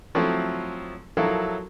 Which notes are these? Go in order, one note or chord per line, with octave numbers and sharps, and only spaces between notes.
F3 F#3 A3 C4 E4 F#4
F3 F#3 E4 A4 A#4 F5